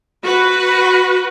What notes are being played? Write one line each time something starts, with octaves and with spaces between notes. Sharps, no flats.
F#4 B4